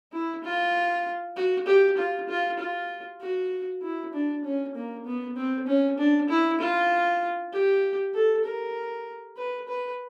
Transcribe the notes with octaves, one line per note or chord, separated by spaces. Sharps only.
E4
F4
F#4
G4
F4
F4
F4
F#4
E4
D4
C#4
A#3
B3
C4
C#4
D4
E4
F4
G4
A4
A#4
B4
B4